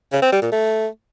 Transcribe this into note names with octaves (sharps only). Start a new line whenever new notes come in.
C#3
C4
G3
A#2
A3